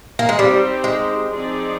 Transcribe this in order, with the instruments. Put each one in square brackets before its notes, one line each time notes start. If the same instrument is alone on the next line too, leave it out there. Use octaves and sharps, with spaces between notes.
[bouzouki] A#3
G#3
[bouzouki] G3 [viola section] C4 D#4 G4 C5
[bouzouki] G#3
[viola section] F3 C4 D#4 G#4 D5